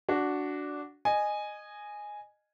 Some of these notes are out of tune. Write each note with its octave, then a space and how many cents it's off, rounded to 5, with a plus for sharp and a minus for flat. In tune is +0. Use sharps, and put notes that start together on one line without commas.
D4 -10 F#4 +0
D#5 -20 G#5 +0